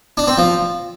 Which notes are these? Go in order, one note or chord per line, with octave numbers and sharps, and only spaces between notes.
D4
C4
F3